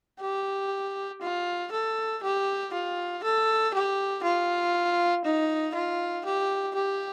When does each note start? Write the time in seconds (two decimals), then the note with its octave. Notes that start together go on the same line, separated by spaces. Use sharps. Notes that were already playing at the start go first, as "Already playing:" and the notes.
0.20 G4
1.22 F4
1.72 A4
2.23 G4
2.73 F4
3.23 A4
3.74 G4
4.23 F4
5.25 D#4
5.75 F4
6.25 G4
6.75 G4